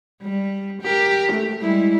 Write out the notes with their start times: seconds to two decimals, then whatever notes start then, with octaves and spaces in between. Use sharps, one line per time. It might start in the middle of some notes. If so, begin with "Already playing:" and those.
0.22 G3
0.82 G4 A#4
1.32 A3
1.61 G3 G#3 E4